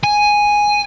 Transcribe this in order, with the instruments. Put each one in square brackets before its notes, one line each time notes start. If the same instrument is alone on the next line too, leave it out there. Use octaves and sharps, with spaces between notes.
[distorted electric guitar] G#5